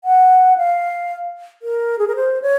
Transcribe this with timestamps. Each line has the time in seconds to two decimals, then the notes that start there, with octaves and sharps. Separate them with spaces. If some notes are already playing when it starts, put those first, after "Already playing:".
0.04 F#5
0.58 F5
1.62 A#4
1.99 G#4
2.07 A#4
2.16 C5
2.42 C#5